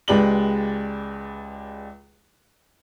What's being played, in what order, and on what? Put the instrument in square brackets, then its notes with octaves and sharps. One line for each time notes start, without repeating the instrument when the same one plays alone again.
[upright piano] C#2 G#3 G4 B4 D5 F#7